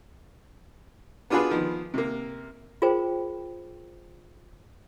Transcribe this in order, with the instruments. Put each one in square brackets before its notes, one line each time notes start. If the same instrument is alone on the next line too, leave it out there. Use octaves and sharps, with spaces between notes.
[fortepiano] B3 D4 F4 F#4 G#4 B4
D#3 F3 B3
C3 A#3
[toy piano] F4 G#4 A#4 C5 G5